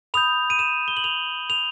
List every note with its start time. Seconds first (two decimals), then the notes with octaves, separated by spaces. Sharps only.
0.14 B5 D#6 G6 F7
0.50 D#7
0.59 E7
0.88 G7
0.97 F#7
1.04 F7
1.50 F7